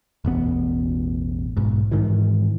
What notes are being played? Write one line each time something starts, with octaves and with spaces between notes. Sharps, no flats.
E1 A1 B3
B1 G#2
G#2 D#3 E3